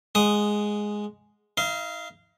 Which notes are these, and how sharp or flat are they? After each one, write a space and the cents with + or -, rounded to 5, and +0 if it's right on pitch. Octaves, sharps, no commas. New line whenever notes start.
G#3 +0 F#5 +0 D#6 -5
D#4 +40 F5 -20